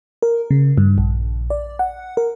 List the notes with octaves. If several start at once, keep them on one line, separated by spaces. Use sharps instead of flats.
A#4
C#3
G2
A#1
D5
F#5
A#4